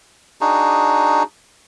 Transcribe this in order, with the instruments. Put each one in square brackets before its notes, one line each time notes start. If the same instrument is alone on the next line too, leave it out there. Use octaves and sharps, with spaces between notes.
[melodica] D4 D#4 F#4 G#4